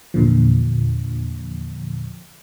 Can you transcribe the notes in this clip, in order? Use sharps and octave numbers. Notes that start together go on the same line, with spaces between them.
E2 A#2 D3 F3